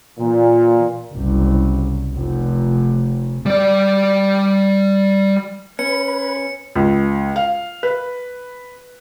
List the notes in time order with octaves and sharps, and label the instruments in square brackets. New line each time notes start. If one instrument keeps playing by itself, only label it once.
[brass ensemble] A#2 [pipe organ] E3 A#3
[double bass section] F#1 C2
F1
[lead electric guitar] G3 D5
[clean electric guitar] C#4 [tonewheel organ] B4 B5 [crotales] C#7
[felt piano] C#2
F5
B4